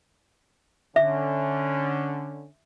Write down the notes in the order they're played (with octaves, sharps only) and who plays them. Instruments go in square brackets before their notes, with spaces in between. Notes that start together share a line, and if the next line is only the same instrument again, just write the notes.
[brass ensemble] D3 C#4 [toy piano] E5